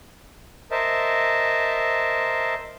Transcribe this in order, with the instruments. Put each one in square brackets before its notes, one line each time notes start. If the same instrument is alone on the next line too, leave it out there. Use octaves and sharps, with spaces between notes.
[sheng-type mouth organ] A#4 C5 D#5 E5 A5